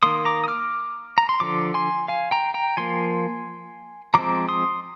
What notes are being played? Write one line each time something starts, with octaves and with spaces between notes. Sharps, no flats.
D#3 A#3 C6 D#6
A#5 D6
D#6
D6 F6
A#5
C6
D3 F3 D6
G#5 C6
F5 G#5
G5 A#5
G5 A#5
F3 A#3 G#5 C6
F3 G#3 C4 A#5 D6
C6 D#6